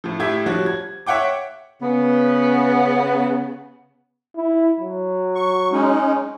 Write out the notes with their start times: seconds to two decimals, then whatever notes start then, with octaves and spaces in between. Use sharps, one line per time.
0.04 A2 F3
0.19 A2 G4 E5 G#6
0.46 F3 G3 F#4 C#5
0.66 G#6
1.06 C#5 E5 F#5 G5 D6
1.81 C#3 B3
4.36 E4
4.80 F#3
5.35 C#6
5.72 G#3 C#4 D#4